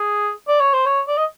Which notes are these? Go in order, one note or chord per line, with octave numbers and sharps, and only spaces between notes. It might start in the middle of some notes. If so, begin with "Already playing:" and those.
Already playing: G#4
D5
C#5
C5
C#5
D5
D#5